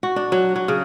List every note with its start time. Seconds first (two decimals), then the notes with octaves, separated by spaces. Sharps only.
0.03 F#4
0.16 D4
0.32 F#3
0.56 F#3
0.68 C#3